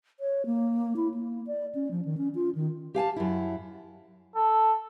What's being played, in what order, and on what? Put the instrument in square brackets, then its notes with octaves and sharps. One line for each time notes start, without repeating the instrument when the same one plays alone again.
[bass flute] C#5
A#3
E4
A#3
D5
C#4
F3
D#3
C#4
F4
D#3
[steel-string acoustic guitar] G4 F5 G#5 A5
F#2 E4
[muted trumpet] A4